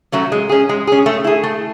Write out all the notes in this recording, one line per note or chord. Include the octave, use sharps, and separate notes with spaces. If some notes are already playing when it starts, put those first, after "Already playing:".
F#3 A3 C#4
G#3
C#4 G#4
G#3
C#4 G#4
A3
E4 G#4
A3